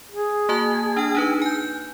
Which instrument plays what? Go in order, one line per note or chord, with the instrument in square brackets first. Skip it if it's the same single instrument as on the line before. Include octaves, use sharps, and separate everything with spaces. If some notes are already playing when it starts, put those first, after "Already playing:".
[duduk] G#4
[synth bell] A#3 F#4 A5
D4 G5 F6
D4 D#4 B4
G#5 G6